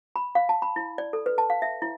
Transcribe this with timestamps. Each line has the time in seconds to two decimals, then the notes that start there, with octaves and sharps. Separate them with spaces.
0.16 B5
0.35 F5
0.49 A5
0.62 B5
0.76 E4
0.98 D5
1.13 A4
1.26 B4
1.38 A5
1.50 F5
1.62 E5
1.82 E4